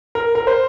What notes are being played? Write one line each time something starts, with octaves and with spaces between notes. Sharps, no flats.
A#4
A#4
C5